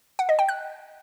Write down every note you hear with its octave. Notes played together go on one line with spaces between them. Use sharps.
F#5
D#5
G5
F#6